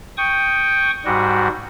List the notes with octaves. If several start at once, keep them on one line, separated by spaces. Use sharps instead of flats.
G5 C#6 D#6
G#2 G3 F#4